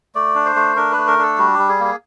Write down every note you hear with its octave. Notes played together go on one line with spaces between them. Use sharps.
A3 D5
D4
C5
A3
D4 A#4
B4
A3
A#4
D4 A4
G3 F#4
G3 G4
G#4
A#3 G#4